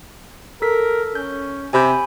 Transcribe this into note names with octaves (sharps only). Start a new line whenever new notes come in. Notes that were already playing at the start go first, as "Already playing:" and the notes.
A4 A#4 B6
C#4 G6
C3 G#5 B5 G6